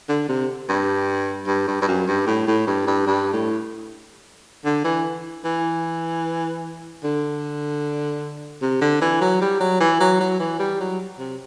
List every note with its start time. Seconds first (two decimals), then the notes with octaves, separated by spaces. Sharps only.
0.09 D3
0.29 C3
0.69 G2
1.47 G2
1.67 G2
1.82 G2
1.88 F#2
2.07 G2
2.26 A2
2.47 A2
2.67 G2
2.87 G2
3.06 G2
3.33 A2
4.65 D3
4.84 E3
5.44 E3
7.03 D3
8.62 C3
8.81 D3
9.01 E3
9.21 F#3
9.41 G3
9.60 F#3
9.80 E3
10.00 F#3
10.20 F#3
10.39 E3
10.59 G3
10.80 F#3
11.19 C3